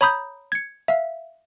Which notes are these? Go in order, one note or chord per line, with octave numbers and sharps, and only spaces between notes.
C#5 A#5 B5 D#6 G6
G#6 C#7
E5 F5